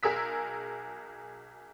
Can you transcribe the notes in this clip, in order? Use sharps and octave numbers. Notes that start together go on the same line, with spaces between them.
B1 G#4 A#4 E6 B6